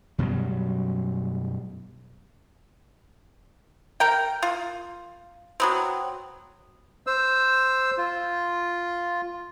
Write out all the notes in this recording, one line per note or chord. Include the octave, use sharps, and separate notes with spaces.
F#2 B2 F#3 G3
A#4 G5
F4
F#3 B3 C4
C5 E6
F4